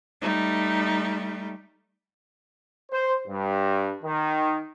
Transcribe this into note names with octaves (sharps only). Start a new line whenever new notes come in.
G3 A3 D#4
C5
G2
D#3